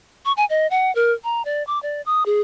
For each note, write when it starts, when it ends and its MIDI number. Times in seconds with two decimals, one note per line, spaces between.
0.25 0.32 85
0.37 0.45 80
0.50 0.67 75
0.71 0.94 78
0.95 1.14 70
1.24 1.44 82
1.45 1.65 74
1.67 1.81 86
1.83 2.02 74
2.06 2.26 87
2.26 2.41 68